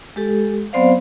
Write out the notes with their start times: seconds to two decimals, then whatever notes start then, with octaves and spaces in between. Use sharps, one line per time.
0.16 G#3 G4 A4
0.73 F#3 B3 C4 C5 D5 F5